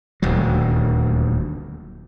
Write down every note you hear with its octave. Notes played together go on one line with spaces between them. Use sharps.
D#1 D2 F#3